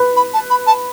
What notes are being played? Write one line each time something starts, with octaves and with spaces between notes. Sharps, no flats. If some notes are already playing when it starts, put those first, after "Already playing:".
Already playing: B4
B5
A5
B5
A5